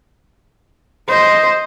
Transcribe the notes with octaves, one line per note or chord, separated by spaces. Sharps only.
C5 D#5